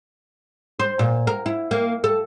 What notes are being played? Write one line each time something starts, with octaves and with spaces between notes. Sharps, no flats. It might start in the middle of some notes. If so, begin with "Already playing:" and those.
C5
A#2
A#4
E4
A#3
A4